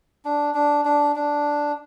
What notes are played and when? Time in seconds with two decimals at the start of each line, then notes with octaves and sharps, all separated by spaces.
0.25 D4
0.54 D4
0.85 D4
1.16 D4